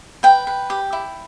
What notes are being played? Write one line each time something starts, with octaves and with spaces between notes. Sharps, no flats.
B4 G5
B4
G4
E4